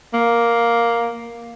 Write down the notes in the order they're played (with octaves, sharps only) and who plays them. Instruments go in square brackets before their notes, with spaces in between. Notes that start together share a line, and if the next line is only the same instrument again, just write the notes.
[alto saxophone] A#3